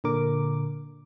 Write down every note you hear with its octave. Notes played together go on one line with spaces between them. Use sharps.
A#2 D3 A#4 D6